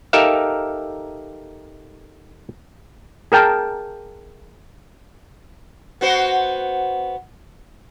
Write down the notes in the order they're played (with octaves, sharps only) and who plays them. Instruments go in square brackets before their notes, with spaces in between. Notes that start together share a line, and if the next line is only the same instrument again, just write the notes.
[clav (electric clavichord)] D#4 G4 A4 A#4 E5 F5
[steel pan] G#4 A#4 G5 A5
[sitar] B3 F#4 C5